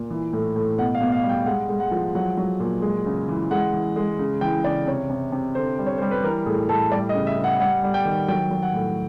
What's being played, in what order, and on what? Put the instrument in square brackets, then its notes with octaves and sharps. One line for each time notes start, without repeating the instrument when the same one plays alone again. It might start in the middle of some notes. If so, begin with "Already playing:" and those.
Already playing: [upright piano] A#2
E3
A2
A2
B2 F#5
F5
B2
F5
G3
G5
G#3 F#5
G#3
F#5
F3
F#3 F#5
F#3
A#2
G#3
C#3
E3
G#3 F#5
E3
G#3
C#3
E3 G5
C#3 D5
C3 C#5
C3
C3
D3 C5
G3
C#5
G3 C5
B4
E3 A#4
A2 G#4
A2 A4
G3 D5
D#5
C#3
E5
C#3
F#5
G3 F#5
G3
G5
D#3
F#3 G5
F#3
F#5
A2